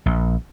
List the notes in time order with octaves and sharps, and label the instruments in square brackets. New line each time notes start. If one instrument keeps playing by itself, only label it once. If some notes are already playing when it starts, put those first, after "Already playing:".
[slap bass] A#1